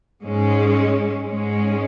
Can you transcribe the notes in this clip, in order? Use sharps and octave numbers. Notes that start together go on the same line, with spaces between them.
G#2 G#3 C#4
G#2 G#3 C#4